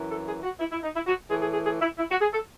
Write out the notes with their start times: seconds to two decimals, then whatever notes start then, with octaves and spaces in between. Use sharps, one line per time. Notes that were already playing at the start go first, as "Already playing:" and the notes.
Already playing: F#2 E3
0.08 A4
0.25 G#4
0.42 F#4
0.60 E4
0.71 E4
0.83 D#4
0.94 E4
1.06 F#4
1.28 A2 E3 G#4
1.40 G#4
1.51 G#4
1.63 G#4
1.80 E4
1.98 E4
2.09 F#4
2.20 G#4
2.31 A4